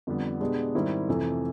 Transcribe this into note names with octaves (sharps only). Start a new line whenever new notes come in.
F2 D3 G3 B3
B2 G#3 B3 D4 G4
G#2 D#3 G3 C4 E4
F2 C3 E3 A3